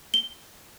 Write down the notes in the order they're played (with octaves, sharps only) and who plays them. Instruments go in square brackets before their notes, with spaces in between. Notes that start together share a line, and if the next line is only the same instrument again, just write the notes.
[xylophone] G7